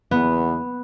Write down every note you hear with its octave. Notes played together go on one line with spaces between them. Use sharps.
E2 B3